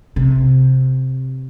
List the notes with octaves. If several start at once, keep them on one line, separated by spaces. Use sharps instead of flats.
C3